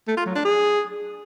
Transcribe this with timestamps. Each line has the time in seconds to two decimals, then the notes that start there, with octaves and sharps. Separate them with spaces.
0.08 A3
0.17 F4
0.26 F#3
0.35 D4
0.45 G#4